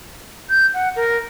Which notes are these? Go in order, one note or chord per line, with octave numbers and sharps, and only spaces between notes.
G6
F#5
A#4